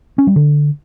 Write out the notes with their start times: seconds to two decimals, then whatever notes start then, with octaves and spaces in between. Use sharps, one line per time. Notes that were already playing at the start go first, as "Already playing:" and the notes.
0.18 C#4
0.27 G3
0.36 D3